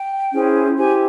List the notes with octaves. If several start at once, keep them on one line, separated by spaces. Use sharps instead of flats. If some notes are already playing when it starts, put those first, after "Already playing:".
Already playing: G5
C#4 E4 G#4 C5
E4 G4 C5 G#5